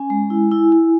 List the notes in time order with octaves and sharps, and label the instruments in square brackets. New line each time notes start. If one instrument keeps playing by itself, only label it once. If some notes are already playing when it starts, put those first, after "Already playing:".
Already playing: [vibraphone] C#4 G#5
G#3
E4
E4
E4